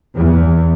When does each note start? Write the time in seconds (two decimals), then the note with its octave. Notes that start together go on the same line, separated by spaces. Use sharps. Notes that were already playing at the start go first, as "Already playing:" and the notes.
0.16 E2